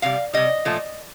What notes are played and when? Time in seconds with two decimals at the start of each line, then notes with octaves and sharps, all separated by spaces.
0.02 C3 G3 F5
0.33 C3 G3 D#5
0.65 A#2 F3 A3